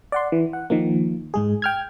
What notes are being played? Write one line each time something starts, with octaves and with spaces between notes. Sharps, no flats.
D5 F#5 C6
E3
F#5
D#3 F3 A#3
G#2 G#3 G#4
G5 F6 G#6